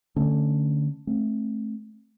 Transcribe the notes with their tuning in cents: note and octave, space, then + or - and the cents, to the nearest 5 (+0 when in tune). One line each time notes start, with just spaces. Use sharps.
D3 +5 A3 +15 C#4 +0
A3 -15 C4 +35